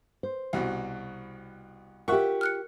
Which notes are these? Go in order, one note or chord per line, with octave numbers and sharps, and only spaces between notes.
C5
C2 B2
F4 G4 A#4 E5 F#5 C#6
F6 F#6 C#7